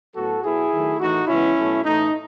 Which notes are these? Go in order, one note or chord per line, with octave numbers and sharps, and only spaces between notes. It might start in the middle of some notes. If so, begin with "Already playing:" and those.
A2 F#3 B3 F#4 A4
B2 F#3 B3 E4 G#4
D#3 F#3 A3
A2 E3 A3 D#4 F#4
C#3 E3 G#3 B3 C#4 E4
B2 F#3 A3
A2 E3 A3 D#4